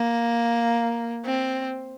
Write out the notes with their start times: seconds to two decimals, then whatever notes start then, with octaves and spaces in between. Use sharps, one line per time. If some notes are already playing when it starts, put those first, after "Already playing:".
Already playing: A#3
1.25 C4